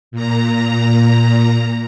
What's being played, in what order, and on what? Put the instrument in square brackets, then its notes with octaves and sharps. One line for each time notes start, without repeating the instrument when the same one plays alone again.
[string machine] A#2 A#5